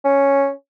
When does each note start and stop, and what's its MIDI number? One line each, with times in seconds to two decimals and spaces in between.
0.05 0.51 61